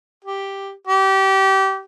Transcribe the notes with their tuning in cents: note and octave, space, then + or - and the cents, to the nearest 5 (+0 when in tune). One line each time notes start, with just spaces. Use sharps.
G4 +0
G4 -25